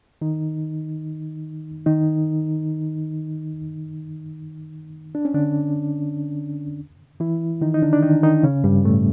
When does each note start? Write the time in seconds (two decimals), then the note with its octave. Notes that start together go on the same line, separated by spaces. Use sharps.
0.21 D#3 D#4
1.86 D#3 D#4
5.15 D4
5.25 C#4
5.34 D3 D4
7.20 E3 E4
7.61 D#3 D#4
7.74 D#4
7.82 D3 D4
7.93 D4
8.03 D#3 D#4
8.23 D#3 D#4
8.43 C#3 C#4
8.64 G2 G3
8.85 A2 A3